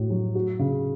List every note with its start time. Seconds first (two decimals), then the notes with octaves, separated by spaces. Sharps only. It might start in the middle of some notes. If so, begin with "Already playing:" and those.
Already playing: A2 F#4
0.10 F#3
0.35 F#4
0.59 C#3